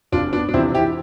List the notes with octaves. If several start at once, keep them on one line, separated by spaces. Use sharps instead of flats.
F1 D4 F4
B3 D4
D4
F2 C3 E3 C4 E4
E4 G4